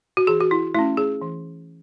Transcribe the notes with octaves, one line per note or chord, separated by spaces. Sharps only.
F#4
E3 G#4
F#4
E4
A3 C#4 E4
G#4
E3